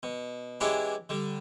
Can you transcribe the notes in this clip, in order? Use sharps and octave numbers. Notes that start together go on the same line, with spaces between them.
B2
E3 G#3 C#4 D4 E4 G4
D3 G3